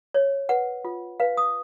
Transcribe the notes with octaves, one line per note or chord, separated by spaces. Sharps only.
C#5
B4 F#5
F4
B4 F5
D#6